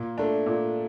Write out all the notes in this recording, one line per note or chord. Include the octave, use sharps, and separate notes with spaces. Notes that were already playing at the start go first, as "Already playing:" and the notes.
Already playing: A#2
A3 D4
A#2